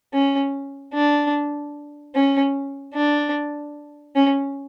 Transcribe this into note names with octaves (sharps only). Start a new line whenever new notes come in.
C#4
D4
C#4
D4
C#4